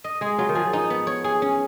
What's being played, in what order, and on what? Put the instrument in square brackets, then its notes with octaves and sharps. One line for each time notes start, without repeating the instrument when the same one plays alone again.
[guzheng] D#5
[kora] G#3 [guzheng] G#4
[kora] F#3 [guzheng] F4
[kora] D#3
[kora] F3 [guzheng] G#4
[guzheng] D#4
B3
C#5
G#4
C#4